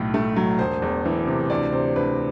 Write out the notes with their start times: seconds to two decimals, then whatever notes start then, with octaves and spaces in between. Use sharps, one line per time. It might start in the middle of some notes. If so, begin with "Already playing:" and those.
Already playing: B1 A2
0.14 A3
0.36 F#3
0.59 E1 C5
0.82 E2
1.05 E3
1.27 C3
1.50 D2 D5
1.72 C3 C5
1.96 D2 B4